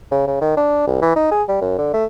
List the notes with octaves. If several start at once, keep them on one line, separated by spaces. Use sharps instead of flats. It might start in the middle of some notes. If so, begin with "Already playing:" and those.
C#3
C#3
D#3
D4
C2
E3
D#4
G#4
G3
F#2
D3
A3